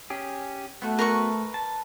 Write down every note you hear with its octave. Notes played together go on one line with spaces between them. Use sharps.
C#4 G4 G#4
A3 B3 F#4
A#4 B4 C#6
A5